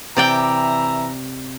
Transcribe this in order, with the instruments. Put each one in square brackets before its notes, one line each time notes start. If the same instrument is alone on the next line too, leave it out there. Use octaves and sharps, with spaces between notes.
[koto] C3 D5 G5 [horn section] E3 E5 A#5